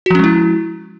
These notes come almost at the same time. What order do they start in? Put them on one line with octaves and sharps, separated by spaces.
F#4 F3 C#4 G#3 E4